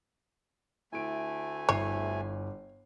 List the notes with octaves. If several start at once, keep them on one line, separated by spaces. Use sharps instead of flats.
D2 A3 E4 G#5 D7
G1 E4 C#5 C7